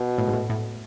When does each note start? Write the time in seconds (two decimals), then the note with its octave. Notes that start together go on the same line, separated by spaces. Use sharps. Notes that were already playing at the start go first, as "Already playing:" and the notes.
Already playing: B2
0.18 A2
0.28 G#2
0.33 A2
0.50 A2